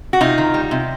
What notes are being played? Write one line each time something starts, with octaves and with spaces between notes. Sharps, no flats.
F#4
C3 D#4 F4
D#3
G3
C3